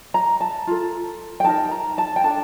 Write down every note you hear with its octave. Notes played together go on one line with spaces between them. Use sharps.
A#5
A5
F4 A4
G5
D#4 G4 A#4 A5
A#5
A5
G5
D4 A4 A5